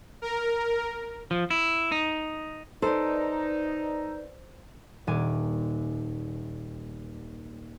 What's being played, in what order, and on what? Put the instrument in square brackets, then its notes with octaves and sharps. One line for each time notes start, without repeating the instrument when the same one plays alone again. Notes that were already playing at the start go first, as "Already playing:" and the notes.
[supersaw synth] A#4
[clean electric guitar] F3
E4
D#4
[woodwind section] D#4 [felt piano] A4 [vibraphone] B4 D5 [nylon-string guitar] C5
[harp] D#1 G#5 D6